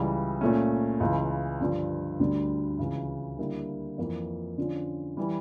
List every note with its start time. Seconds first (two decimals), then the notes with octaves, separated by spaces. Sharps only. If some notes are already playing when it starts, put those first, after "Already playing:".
Already playing: C#2 C#3 E3 G3
0.41 A#2 A3 C#4
1.00 C#2 C#3 E3
1.60 G2 D3 F3
2.19 D2 D3 G3
2.79 C#2 C#3 E3
3.38 D3 G3 A#3 E4 G4
3.98 F2 E3 A#3
4.58 D3 F3 C#4
5.17 E3 G3